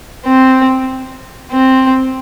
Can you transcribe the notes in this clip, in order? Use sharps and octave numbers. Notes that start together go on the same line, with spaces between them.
C4
C4